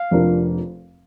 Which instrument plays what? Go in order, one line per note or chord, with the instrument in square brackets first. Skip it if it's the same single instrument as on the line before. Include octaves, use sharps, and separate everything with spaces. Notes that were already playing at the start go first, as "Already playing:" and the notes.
Already playing: [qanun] F5
[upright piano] F1 F2 F3 D4 A#4